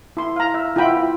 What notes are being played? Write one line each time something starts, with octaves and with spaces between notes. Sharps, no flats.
E4 C6
F5 A#5
E5
E4 F4 F#5 G5 B5